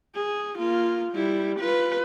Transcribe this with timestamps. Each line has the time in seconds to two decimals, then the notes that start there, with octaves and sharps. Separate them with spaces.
0.15 G#4
0.59 A#3 F4
1.13 G3 E4
1.60 F4 B4